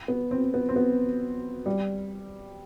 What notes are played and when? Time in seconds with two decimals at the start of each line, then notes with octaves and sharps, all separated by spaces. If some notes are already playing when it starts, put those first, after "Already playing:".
0.08 B3
0.31 C4
0.54 B3
0.69 C4
0.76 B3
1.66 G3